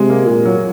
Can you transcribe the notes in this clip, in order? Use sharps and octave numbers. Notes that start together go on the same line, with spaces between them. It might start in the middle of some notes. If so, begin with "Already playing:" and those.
Already playing: C3 G#3
A#3
A#2 G#3
F#3